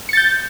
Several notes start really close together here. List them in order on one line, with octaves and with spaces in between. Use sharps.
C#7 A6 G6